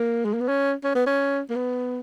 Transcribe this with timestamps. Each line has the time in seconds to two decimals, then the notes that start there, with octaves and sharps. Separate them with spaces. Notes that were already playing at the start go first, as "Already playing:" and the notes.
Already playing: A#3
0.25 G#3
0.33 A#3
0.40 B3
0.48 C#4
0.84 C#4
0.95 B3
1.06 C#4
1.50 A#3
1.55 B3